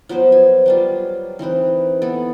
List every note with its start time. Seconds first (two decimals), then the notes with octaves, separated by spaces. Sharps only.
0.09 F3 F#3 B3 C5
0.32 G#5
0.66 F#3 G3 F4
1.39 E3 C4 D#4 B4
2.02 B3 A4